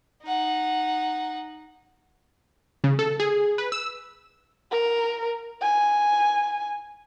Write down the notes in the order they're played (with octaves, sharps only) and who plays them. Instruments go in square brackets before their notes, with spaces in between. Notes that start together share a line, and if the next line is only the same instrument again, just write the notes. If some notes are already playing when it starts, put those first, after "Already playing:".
[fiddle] D#4 F#5
[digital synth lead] C#3
A4
G#4
B4
E6
[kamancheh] A#4
G#5